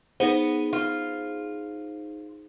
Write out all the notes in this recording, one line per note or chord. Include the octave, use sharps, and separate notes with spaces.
B3 D#4 G#4 C5
F4